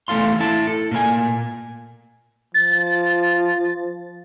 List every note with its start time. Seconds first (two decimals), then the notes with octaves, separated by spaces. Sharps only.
0.08 E2 A3 A4 F5 C6
0.40 E4 A5
0.67 A4
0.91 A#2 A#3 B4 G#5
2.54 F3 A6